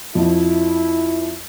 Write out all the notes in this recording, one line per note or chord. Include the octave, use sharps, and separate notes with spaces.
F2 F3 E4